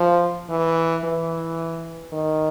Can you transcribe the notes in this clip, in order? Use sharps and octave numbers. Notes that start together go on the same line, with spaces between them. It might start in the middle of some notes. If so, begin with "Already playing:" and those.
Already playing: F3
E3
E3
D#3